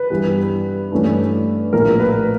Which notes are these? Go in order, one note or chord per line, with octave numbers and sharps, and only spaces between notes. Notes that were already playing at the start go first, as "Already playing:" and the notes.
Already playing: B4
G2 E3 G3 B3
G2 E3 A3 C#4
A#1 A2 F3 A#3 A#4
B4